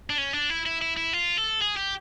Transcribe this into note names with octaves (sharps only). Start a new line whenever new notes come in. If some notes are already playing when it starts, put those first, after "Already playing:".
D4
C#4
D4
E4
E4
E4
E4
F4
A4
G#4
G4